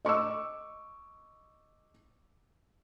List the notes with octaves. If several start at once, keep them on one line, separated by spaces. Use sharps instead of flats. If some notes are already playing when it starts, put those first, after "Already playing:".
D#5 C#6 D6 E6